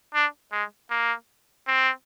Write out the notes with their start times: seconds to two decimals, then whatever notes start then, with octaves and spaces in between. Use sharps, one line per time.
0.14 D4
0.52 G#3
0.90 A#3
1.67 C4